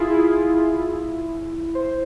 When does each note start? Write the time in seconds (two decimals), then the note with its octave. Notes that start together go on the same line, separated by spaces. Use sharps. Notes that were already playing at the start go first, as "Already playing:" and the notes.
Already playing: E4 F4 G#4
1.75 C5